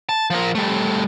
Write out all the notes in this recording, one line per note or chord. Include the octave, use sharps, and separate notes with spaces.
A5
F3 A#4
G3 A3